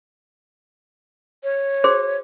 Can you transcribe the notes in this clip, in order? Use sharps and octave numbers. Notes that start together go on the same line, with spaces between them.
C#5
F#4 G#4 C5